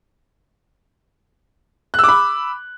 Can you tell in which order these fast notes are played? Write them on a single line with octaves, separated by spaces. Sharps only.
F#6 E6 D6 B5